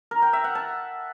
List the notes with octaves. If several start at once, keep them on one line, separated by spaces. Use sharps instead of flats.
A#4
G5
E5
F#5
A5